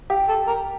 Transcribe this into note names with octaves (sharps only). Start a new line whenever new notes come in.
G4
A4
A#4